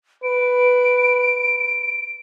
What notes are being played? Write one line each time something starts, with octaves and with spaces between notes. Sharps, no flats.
B4 D7